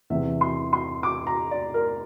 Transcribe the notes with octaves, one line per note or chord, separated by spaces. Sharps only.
E2 C3 E3 E5
C6
C6
D6
A#5
D5
A#4